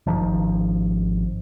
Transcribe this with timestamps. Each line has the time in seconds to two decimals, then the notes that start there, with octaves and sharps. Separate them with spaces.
0.07 G#1 E2 D#3 F3